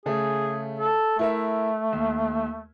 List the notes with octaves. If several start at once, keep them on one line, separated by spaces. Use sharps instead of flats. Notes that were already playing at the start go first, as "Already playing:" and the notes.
C#3 A3 G#4
A4
A3 E4 A#4 E5
D#2